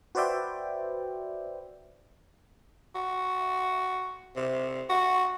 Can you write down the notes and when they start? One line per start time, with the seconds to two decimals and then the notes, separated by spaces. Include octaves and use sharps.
0.15 F#4 B4 C5 D5 E5 G5
2.95 F#4
4.36 C3
4.89 F#4